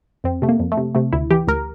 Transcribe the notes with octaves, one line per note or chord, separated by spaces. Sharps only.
F2 C4
C3 A3
A#3
F2
A3
C3
C3 A3
D2 E4
E3 G4
D2 A#4